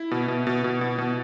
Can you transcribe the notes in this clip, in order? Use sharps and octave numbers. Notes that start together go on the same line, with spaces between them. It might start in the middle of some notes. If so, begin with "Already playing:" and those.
Already playing: E4
B2
B2
B2
B2
B2
B2